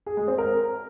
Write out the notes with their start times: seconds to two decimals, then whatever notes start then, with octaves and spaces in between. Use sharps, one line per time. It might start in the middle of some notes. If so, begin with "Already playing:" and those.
0.06 G#4
0.17 G#3
0.28 C4
0.38 A#4